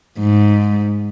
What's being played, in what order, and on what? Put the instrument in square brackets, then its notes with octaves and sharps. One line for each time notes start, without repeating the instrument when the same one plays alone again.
[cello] G#2